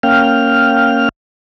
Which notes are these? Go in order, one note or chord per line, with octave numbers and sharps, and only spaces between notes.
A#3 C#4 F5 G5 F6